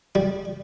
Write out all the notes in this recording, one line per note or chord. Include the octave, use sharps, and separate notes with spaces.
G3